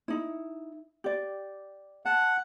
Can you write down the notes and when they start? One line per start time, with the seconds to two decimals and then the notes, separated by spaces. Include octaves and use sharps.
0.08 D#4 E4
1.04 G4 D5
2.05 F#5 A5